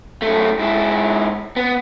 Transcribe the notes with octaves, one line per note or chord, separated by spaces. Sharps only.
F#2 A3
G#2 E4
B3